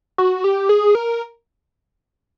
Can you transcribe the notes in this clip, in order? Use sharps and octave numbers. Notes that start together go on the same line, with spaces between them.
F#4
G4
G#4
A#4